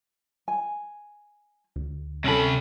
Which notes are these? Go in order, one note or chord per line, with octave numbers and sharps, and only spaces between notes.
G#5
D2
C3 C#4 A4 B5